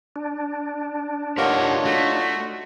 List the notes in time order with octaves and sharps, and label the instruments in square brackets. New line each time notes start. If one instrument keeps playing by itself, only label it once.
[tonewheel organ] D4
[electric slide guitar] A3 G4 F#5 [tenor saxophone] A#3 [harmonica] D#4 F4 C#5
[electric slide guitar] A3 [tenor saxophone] F#4